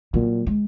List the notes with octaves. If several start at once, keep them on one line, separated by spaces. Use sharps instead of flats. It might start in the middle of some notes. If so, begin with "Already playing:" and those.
A#2 F#3
G#3